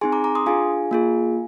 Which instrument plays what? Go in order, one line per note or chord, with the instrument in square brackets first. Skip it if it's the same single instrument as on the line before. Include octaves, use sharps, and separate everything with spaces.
[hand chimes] C4 D#4 G#4 G#5 C6
A#5 D6
A#5 D6
C6 D#6
D4 F4 G#4 F5 G#5
A#3 F4 G#4